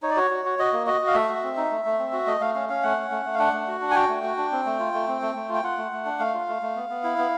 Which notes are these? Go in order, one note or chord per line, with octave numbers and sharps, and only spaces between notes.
D#4 C#5
D5
F#4 C#5
F#4
F#4
F#4 D#5
A#3
F#4 D#5
F#4
F5
A3 E5
F#4
C4
D#4
A3
A3
C4
F#4
A3 D#5
A3 F5
C#4 F5
C#4 F5
A3 F#5
C#4
A3
A3
F5
D4 F#5
A3
F#4
D4
G#5
F#4 G5
A3
F#4
D4
C4
A3
F4
A3
C4
A3
A3
F4
G5
F4 F#5
A3
A3
D4
A3 F5
F4
A3
A3
B3
B3
E4
B3